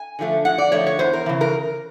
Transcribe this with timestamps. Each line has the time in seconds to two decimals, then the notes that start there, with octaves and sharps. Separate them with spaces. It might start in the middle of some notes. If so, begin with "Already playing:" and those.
Already playing: G#5
0.19 D3 F3 A3
0.45 F2 F#5
0.58 D5
0.72 D3 F3 A3 C#5
0.87 C#5
0.99 E2 C5
1.13 A#4
1.26 C#3 E3
1.41 A#4